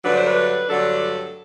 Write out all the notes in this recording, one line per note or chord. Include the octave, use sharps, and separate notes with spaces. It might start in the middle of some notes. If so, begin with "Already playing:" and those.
G2 D3 F#3 A3 D4 B4
C5
B4
G2 D3 F#3 A3 D4 A4